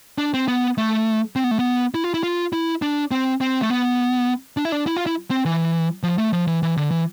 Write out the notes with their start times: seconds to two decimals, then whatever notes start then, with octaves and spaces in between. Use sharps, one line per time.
0.18 D4
0.34 C4
0.48 B3
0.78 A3
1.36 C4
1.44 B3
1.51 A3
1.59 B3
1.94 E4
2.04 F4
2.14 E4
2.23 F4
2.53 E4
2.82 D4
3.11 C4
3.41 C4
3.62 A3
3.70 B3
4.57 D4
4.65 E4
4.72 D4
4.87 E4
4.97 F4
5.06 E4
5.31 C4
5.45 E3
6.03 F3
6.18 A3
6.33 F3
6.47 E3
6.63 E3
6.77 D3
6.91 E3